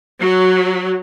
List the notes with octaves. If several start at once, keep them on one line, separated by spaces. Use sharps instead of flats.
F#3